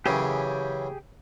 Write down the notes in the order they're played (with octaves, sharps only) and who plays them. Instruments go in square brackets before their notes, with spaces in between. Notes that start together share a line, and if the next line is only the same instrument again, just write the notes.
[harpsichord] F#2 C#3 E3 [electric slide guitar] G4 G#4